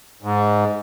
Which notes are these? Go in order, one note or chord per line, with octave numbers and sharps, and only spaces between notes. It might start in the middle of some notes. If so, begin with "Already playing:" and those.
G#2